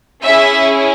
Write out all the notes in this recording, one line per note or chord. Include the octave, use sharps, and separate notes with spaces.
C#4 E4 G#4 E5